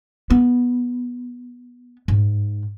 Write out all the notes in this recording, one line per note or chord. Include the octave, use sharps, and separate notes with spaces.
B3
G#2